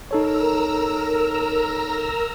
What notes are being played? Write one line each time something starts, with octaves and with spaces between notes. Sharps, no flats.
D#4 A4 A#4 C#5 A#5 E6